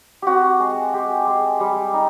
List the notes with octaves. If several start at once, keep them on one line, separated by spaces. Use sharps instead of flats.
C4 F#4 G4
G#3
G#3 G4
G#3
G3
D#4